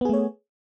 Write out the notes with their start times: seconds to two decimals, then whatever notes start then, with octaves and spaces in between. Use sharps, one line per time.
0.01 B3
0.05 G#4
0.09 A3
0.13 C#5